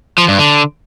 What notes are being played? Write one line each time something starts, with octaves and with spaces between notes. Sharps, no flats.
F3
G2
D3